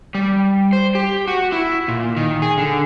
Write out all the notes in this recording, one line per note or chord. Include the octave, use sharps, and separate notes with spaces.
G3
C5
G4
F#4
E4
A#2
D#3
G#4
D3